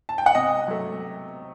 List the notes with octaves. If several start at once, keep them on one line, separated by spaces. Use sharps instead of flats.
A5
G5
F#5
C3 D#5
F#3 A3